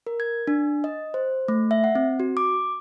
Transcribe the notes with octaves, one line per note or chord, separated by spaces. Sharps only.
A#4
G#6
D4
D#5
C5
A3
E5
F#5
C4
F#4
D6